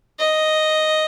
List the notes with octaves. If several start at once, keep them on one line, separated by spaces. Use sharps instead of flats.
D#5